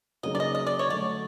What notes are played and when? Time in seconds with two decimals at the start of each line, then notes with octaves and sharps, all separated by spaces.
0.23 C#3 F#3 A#3 D#4 G#4 D#5
0.35 D5
0.40 D#5
0.55 D#5
0.67 D5
0.79 C#5
0.87 D3 F#3 A3 D5